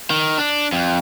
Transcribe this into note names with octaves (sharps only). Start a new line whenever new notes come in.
D#3
D4
F2